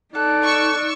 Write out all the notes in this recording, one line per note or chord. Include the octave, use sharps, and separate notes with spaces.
D#4 A4 D5 F#6
C#6 E6